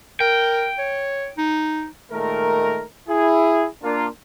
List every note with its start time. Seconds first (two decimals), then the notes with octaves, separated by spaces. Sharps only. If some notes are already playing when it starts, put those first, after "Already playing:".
0.20 A#4 G5
0.79 C#5
1.38 D#4
2.12 A#2 D#3 G#3 A3 A#4
3.09 E4 G#4
3.83 A#3 D4 F4